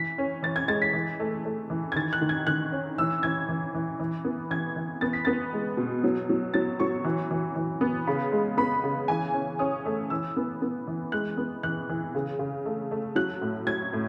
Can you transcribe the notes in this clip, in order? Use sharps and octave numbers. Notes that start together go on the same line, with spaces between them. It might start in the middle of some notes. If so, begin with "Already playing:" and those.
Already playing: E3 B6
C#4
E3 A6
G#6
G#3 A6
B6
E3
A3
A3
E3
G#6
D#3 A6
F#6
D#3
G#6
D#3 F#6
C#4
E3 E6
E3 G#6
E3
E3
E3
B3
E3 G#6
E3
B3 A6
B6
B3 A6
G#3
B2
F#3
F#3
F#3 A6
F#3 C#6
E3
E3
E3
B3
C#3 B5
G#3
B3 B5
C#3
E3 G#5
C#4
C#4 D#6
A3
E3 E6
B3
B3
E3
G#3 F#6
B3
E3 F#6
E3
C#3
C#3
A3
A3
F#3 F#6
A2
F#3 G#6
A2